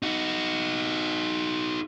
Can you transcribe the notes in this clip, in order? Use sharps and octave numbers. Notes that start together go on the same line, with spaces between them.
D#4 F#4